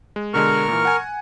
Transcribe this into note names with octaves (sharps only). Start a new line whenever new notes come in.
G#3
B2 D3 G#3 A#4 C#6 F6
A#2 E3
F#5 G#5